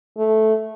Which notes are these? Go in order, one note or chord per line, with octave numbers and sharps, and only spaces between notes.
A3